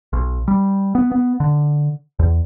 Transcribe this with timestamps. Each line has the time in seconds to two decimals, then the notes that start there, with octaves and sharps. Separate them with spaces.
0.13 B1
0.48 G3
0.95 B3
1.12 B3
1.40 D3
2.19 E2